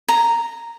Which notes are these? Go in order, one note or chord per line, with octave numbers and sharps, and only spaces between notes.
A#5